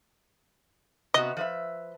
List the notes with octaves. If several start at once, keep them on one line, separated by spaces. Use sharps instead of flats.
C3 B3 F#4 D#5
F3 B4 E5